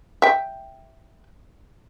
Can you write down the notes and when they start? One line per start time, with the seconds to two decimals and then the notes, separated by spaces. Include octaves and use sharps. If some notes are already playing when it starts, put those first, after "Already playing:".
0.22 E5 G5